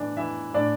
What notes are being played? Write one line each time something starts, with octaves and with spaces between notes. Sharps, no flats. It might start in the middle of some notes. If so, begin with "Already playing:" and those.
Already playing: A2 E3 D4 D5
E3 E4 E5
A2 D4 D5